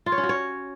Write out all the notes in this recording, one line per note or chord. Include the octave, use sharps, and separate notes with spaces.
F4
C#5
C#4
F#4
C#5